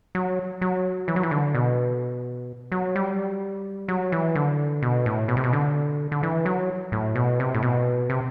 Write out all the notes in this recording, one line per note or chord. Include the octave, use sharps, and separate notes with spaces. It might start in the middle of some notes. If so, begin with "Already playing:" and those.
F#3
F#3
E3
F#3
E3
D3
B2
F#3
G3
F#3
E3
D3
B2
A2
B2
C3
B2
D3
D3
E3
F#3
A2
B2
C3
A2
B2
C3